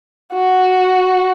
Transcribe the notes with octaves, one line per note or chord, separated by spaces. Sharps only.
F#4